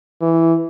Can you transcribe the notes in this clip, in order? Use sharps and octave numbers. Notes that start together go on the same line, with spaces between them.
E3